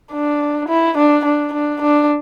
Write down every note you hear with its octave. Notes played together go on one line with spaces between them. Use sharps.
D4
E4
D4
D4
D4
D4